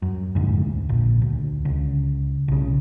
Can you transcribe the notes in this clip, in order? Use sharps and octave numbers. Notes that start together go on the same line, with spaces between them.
F#2
F1 D2 G#2
A#1
D2
C#2
B1 C#3